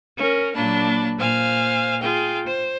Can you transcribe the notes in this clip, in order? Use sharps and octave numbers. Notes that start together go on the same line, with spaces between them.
C#4 A#4
A#2 F#3 A#3 D4 A5 B5
A#2 C5 F5 G#5 F6
F4 G#4 G5
C5